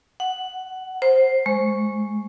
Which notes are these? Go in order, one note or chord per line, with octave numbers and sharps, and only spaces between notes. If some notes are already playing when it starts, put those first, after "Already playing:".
F#5
C5
G#3